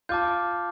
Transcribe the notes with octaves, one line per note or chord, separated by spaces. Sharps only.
F4 A5 D6 G6